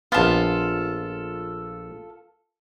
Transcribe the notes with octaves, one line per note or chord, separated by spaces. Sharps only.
A#1 B3 F4 A4